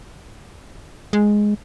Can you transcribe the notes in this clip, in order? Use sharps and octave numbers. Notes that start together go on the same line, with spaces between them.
G#3